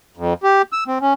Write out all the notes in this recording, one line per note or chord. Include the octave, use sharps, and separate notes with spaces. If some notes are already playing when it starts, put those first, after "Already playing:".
F2
G4
E6
C4
C#4